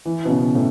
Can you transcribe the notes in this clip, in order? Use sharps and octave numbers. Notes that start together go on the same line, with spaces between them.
E3
B2
C#3
A2